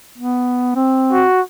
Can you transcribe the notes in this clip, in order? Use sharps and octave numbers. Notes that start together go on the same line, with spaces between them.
B3
C4
F#4